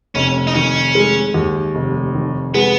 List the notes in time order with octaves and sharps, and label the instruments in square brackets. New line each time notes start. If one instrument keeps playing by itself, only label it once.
[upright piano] F1 [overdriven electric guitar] C#4
[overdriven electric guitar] D#4
[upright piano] D#3 [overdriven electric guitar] C#4
[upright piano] G#3
D#2
F1
D#3
[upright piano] G#3 [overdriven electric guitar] B3